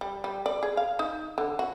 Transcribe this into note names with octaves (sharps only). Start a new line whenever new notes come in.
G3
G3
D5
G#4
F5
D#4
D3
F#4